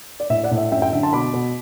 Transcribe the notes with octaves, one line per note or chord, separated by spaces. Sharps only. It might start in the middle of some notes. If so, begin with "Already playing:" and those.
D5
A2 E5
D5 F#5
A2
E5
F#2 E5 G5
E5 G5
D3 E5
A5 C6
B2 B5 D6
B2